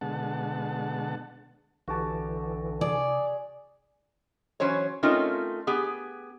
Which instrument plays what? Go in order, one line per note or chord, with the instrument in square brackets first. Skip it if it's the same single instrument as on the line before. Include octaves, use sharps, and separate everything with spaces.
[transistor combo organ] B2 D3 G#3 F#5 A5
[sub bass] B1 [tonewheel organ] D3 E3 [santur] F#4 G4 A5
[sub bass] C3 [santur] G#4 [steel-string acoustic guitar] D5
[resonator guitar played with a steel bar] E3 F#3 C#4 C5 C#5
A3 C4 C#4 D#4 F4 A#4
B3 G4 G#4